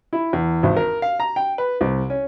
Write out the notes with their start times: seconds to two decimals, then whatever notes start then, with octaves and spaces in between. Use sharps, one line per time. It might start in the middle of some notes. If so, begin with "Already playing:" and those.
0.13 E4
0.33 E2
0.63 G#1
0.77 A#4
1.02 F5
1.20 A#5
1.36 G5
1.58 B4
1.81 C2
2.10 C#4